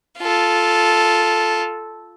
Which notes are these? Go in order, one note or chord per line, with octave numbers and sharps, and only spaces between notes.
F4 A4